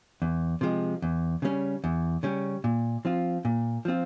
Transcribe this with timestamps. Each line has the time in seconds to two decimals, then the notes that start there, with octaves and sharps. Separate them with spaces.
0.22 E2
0.61 C3 F3 G#3
1.02 E2
1.42 C#3 G3 C#4
1.84 E2
2.23 C#3 G3 C#4
2.64 A#2
3.05 F3 C4 F4
3.45 A#2
3.85 F3 C4 F4